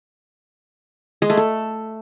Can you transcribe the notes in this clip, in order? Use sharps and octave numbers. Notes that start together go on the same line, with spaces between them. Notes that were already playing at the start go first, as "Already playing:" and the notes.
G#3
A3
A4